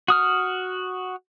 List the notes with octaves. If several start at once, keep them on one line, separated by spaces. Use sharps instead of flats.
F#4 D#6 F6